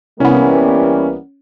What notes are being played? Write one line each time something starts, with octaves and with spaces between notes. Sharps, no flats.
C2 E3 G3 A#3 B3 C#4